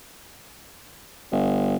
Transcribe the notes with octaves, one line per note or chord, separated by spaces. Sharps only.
G1